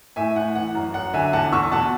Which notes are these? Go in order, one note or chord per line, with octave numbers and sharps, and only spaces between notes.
A2 E5 G#5
A2 F#5
E3 F#5
F#2
F#2 F#5
D3 E5 G#5
E2 F#5 A5
E2 C#6 E6
B2 F#5 A5